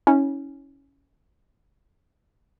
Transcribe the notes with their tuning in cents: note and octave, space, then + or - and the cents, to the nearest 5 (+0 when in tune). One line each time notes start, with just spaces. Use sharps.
C#4 +0 E4 -40